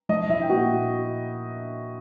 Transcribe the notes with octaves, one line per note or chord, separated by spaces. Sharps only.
F3 D#5
F3 E4 E5
G5
A#2 F#4 F#5
A#2